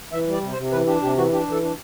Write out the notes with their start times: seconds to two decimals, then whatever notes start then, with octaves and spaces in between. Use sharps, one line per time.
0.12 E3 E5
0.27 G3
0.32 D5
0.42 C3
0.52 C5
0.57 C3
0.72 E3 B4
0.87 D4 G4
1.02 C3 G4
1.17 E3 F#4
1.32 D4 G4
1.47 E3 A4
1.62 D4